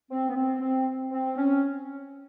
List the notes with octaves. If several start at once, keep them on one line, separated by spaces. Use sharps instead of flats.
C4
B3
C4
C4
C4
C#4